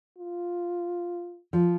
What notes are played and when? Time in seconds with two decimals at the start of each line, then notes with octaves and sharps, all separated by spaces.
0.18 F4
1.53 F3